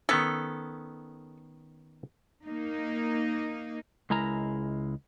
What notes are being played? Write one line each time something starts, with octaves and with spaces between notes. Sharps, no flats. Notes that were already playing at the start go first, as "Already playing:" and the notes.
D#3 B3 C#4 A4
A#3 D#4
C#2 G#3 E4 A#4 A#5